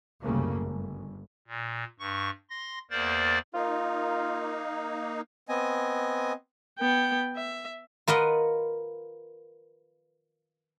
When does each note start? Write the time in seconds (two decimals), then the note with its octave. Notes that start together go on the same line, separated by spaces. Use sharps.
0.23 C2 F#2 C#3 G3 A3 A#3
0.61 G1
1.48 A#2
1.99 G2 C#6
2.50 C6 A#6
2.91 E2 A#3 A#4 C5 D5 A6
3.54 A#3 D#4 F4
5.49 B3 C4 D#5 G#5
6.79 B3 G5
7.36 E5
8.08 F4 A#4 B4 D#5 F#5